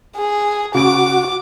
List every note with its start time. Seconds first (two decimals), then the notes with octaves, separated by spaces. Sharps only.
0.16 G#4
0.75 C#3 F#4 D6 D7